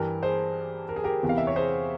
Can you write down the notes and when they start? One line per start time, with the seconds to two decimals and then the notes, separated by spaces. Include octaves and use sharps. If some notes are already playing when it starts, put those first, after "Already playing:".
Already playing: G2 E3 G4 A#4
0.23 G#4 C5
0.89 A#4
0.96 G#4
1.04 G4 A#4
1.23 E2 C3 E3
1.29 F5
1.38 E5
1.47 C#5
1.56 G#4 C5